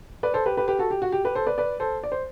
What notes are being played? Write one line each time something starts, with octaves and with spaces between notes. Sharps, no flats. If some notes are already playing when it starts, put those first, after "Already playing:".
B4 D5
A4 C5
G4 B4
G4 B4
G4 B4
F#4 A4
G4
F#4
G4
G4 B4
A4 C5
B4 D5
B4 D5
A4 C5
D5
C5